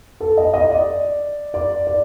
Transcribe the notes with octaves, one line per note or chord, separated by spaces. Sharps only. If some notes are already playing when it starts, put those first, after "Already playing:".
A4
D#5
D#5
D5
D5
D5